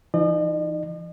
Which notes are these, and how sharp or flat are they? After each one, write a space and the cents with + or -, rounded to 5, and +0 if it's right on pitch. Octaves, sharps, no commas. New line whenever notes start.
E3 +45 D#4 +0 D#5 -45